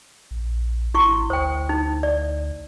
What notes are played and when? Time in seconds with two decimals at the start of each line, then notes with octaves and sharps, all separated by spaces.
0.31 A#1
0.94 G#1 E4 C6 C#6
1.30 D2 C5 G5
1.69 D#4
2.03 D5